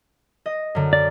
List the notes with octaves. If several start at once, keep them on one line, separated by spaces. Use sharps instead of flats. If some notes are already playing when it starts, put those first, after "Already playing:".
D#5
F#2 D3
D5